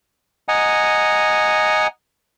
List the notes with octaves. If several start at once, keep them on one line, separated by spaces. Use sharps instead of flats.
D#5 F#5 G#5 A#5